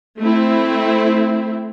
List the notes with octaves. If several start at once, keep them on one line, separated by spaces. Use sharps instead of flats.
A3 C4 E4